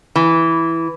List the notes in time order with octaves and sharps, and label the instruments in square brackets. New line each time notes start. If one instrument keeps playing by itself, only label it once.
[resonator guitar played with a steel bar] E3